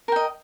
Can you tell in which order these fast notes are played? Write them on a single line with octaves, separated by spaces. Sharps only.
A#4 G5 D#5